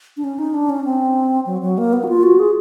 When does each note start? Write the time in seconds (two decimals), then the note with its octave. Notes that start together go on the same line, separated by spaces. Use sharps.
0.17 D4
0.24 C#4
0.39 D#4
0.54 D4
0.70 C#4
0.85 C4
1.46 F#3
1.61 F#3
1.78 A#3
1.93 B3
2.04 F#4
2.08 F4
2.23 F#4
2.39 G#4